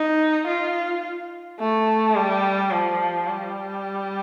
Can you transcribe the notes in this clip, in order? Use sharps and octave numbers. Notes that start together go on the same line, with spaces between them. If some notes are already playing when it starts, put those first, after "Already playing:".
Already playing: D#4
F4
A3
G3
F3
G3